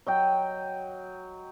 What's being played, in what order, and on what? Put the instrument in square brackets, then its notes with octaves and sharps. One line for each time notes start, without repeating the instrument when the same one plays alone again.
[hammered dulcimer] F#3 D#5 G5